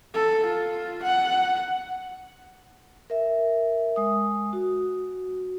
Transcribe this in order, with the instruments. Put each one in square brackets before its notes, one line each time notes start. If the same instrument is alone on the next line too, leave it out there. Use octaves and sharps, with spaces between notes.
[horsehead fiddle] A4
F4
F#5
[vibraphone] A#4 E5
G#3 D#6
F#4